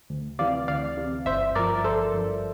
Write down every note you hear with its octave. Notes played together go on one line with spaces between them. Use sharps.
D2
C3 E3 D5 F5
D2 D5 F5
C3 E3
G1 C5 E5
G2 F3 A#4 D5
G1 A4 C5
G2 F3